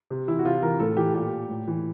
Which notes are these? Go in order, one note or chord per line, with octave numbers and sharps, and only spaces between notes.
C3
E3 E4
F#4
C3 F4
E3 A#4
A2 A4
E3 G4
A#2 G4
A2
E3